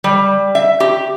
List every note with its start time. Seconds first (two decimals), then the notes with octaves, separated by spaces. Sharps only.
0.04 G3
0.55 E5
0.80 G4